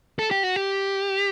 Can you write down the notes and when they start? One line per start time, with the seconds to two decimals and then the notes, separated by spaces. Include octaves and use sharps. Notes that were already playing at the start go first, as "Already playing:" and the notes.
0.19 A4
0.31 G4
0.43 F#4
0.56 G4